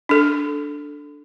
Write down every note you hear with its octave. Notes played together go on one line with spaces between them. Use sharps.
D4 A4